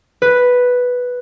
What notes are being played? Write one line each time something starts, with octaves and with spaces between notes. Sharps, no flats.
B4